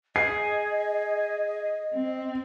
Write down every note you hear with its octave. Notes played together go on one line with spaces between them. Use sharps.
G#4 D#5 C7
C4